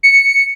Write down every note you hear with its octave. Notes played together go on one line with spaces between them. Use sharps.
C#7